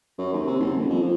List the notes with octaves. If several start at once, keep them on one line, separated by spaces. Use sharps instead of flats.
F#2
D#2
C3
F#1
D#1
F2
F3